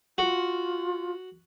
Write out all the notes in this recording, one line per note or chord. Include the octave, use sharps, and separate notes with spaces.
F4 F#4